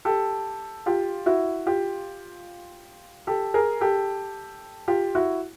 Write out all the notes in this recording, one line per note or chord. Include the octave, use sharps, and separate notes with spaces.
G4 A4
F4 G4
E4 F#4
F4 G4
G4 A4
G#4 A#4
G4 A4
F4 G4
E4 F#4